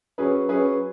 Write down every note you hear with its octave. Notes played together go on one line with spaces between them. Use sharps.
F#3 C#4 G#4 B4
F#3 C#4 G#4 B4